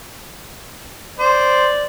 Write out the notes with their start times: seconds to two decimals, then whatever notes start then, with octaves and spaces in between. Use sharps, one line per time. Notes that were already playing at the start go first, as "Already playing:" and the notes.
1.19 C5 D5